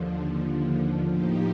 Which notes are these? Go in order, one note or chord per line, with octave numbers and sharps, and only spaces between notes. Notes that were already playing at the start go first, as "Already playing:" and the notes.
Already playing: D#2 D3 F3
A2 F3 A#3 D#4 G4